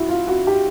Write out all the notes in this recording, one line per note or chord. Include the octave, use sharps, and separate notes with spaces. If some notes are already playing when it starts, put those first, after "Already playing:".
Already playing: E4 F#4
F4
F#4
G4